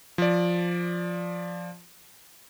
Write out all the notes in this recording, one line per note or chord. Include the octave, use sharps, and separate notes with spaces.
F3 D5